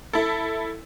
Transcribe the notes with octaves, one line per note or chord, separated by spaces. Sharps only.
E4 A4